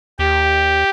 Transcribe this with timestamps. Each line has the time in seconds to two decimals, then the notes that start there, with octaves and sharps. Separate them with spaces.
0.19 D#2 G4